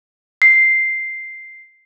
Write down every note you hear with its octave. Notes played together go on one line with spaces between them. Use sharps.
C7